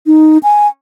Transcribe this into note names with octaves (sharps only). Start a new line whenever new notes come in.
D#4
G#5